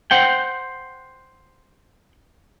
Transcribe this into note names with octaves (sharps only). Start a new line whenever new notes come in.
C5 F#5 G5